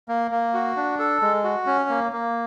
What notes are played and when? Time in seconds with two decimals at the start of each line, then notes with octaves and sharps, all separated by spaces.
0.09 A#3
0.31 A#3
0.54 F#4
0.76 D4
0.99 A4
1.22 G#3
1.44 F#4
1.66 C#4
1.89 A#3
2.12 A#3